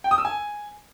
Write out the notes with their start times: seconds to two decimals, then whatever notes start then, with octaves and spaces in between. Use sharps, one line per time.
0.04 G5
0.11 D#6
0.18 E6
0.25 G#5